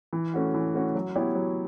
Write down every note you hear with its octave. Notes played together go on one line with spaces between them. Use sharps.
E3
A3 C#4 F#4
E3
A3 C#4 F#4
F#3
B3 E4 G4 C#5
F#3